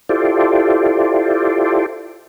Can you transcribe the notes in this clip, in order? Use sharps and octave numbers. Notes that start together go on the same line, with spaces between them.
E4 F4 G4 A4 C5 D5